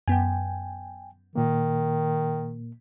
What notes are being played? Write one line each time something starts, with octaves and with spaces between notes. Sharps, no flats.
F#2 B3 G5 G#5
A#2 D#3 A#3